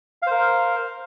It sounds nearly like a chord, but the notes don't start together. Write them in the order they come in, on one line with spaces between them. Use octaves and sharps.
F5 C5 A#4